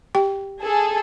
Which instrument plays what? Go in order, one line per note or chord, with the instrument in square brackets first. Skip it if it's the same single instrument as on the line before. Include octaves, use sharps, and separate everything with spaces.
[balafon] G4 G5
[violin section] G#4 A4